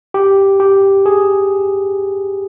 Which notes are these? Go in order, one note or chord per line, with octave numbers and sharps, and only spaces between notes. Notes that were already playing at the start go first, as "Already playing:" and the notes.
G4
G4
G#4